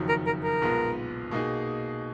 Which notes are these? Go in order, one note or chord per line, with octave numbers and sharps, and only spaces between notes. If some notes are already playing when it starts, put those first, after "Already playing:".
Already playing: F#1 F2 D#3 F#3
A#4
A#4
A#4
B1 A#2 G#3 B3
B2 A#3 D#4 G#4